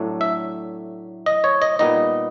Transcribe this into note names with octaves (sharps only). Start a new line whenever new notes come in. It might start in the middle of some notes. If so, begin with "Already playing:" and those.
Already playing: A2 F#3 A3 D4
E5
D#5
C#5
D#5
A#2 G3 B3 D#4 D#5